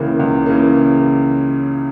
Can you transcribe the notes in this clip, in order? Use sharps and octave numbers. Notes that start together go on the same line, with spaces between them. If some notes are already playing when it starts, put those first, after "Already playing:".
Already playing: C#2 C#3 E3 A#3
C#2
C#3 E3 A#3